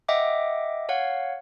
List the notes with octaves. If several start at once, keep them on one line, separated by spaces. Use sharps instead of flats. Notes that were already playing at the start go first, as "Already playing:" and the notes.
D#5 E5 F#5 G5 D6
C#5 F5 F#5